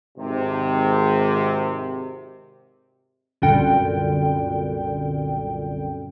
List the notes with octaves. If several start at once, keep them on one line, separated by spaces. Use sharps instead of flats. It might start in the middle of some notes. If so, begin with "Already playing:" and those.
G#1 C3
C2 F#2 A#2 D3 G5